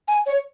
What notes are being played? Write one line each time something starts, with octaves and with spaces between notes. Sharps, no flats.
G#5
C#5